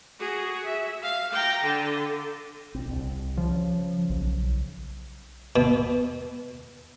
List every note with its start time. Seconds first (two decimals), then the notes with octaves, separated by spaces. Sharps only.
0.19 F#4 G#4
0.65 E5
1.02 F5
1.32 G5 A#5
1.63 D3
2.75 B1 C4
2.91 C2
3.37 C#3 F3
4.10 B1
5.56 B2